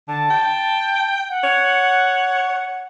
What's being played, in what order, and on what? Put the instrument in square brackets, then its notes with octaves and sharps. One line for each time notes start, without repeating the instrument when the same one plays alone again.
[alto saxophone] D3 [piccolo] A5
[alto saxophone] G5
[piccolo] F#5
[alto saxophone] C#5